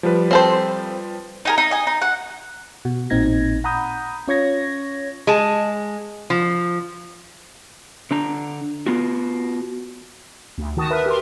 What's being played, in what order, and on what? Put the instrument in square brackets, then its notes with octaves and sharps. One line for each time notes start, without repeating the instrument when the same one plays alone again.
[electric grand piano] F3 G3 B4
[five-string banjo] C4 A4 C5
[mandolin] D#4 G#4 A#4
D#4
D#5 G#5
D#4
F#5
[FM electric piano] B2 F#4
A1 A#2 C4 D#4 G#6 A#6
F#5 A#5 B5 D#6 G6
C#4 F4 C#5 C#6 G#6 A#6
[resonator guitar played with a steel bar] G#3 A5
F3
[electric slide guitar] D3 D4 A#5
B3 F4 F#4
[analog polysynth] D2
D#3 F#4 A5 D#6
A#4 B4 E5
G4 A#4 C6